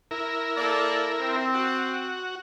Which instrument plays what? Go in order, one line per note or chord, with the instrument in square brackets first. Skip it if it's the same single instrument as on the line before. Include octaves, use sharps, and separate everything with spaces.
[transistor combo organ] E4 A#4
[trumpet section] A#3 A4 D5
C4
[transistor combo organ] F#4